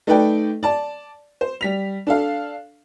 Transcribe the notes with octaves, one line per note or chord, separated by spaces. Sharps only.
A3 D#4 A4 B4 D5 G5
D5 A5
C5
G3 B6 F7
D4 A4 F5